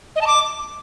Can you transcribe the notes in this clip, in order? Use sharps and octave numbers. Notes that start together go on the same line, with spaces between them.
D#5
A5
D6